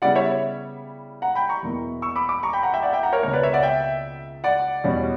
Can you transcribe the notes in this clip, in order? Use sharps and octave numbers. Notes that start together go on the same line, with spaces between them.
C#3 G3 B3 E4 D5 F#5
C#5 E5
F#5 A#5
G5 B5
A#5 C#6
E2 B2 A#3 E4
C#6 E6
B5 D6
B5 D6
A#5 C#6
G5 B5
F#5 A#5
E5 G5
D5 F#5
E5 G5
F#5 A#5
A#4 C#5
C#2 B2 A#3 A#4 C#5
B4 D5
C#5 E5
D5 F#5
E5 G5
D5 F#5
E2 B2 G3 C#4